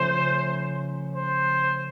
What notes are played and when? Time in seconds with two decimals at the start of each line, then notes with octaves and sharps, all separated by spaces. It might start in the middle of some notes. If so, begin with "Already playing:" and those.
Already playing: C#3 F3 A3 C#4 C5
1.16 C5